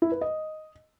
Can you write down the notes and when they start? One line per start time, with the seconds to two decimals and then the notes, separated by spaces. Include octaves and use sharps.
0.02 E4
0.12 B4
0.21 D#5